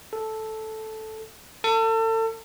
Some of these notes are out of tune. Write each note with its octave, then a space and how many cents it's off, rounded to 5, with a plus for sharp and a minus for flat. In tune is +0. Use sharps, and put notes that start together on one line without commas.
A4 -5
A4 +35